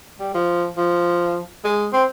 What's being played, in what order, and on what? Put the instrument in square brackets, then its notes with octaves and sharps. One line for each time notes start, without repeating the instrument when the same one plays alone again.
[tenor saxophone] G3
F3
F3
G#3
C4